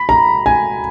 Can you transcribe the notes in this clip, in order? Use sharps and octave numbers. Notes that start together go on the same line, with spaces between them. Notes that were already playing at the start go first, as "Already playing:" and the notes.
Already playing: B5
A#5
G#5